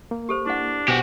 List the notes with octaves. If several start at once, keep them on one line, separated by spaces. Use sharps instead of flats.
A#3
G4 A4 C5
D4 E4 F#5
B2 F#4 G4 C5 G#5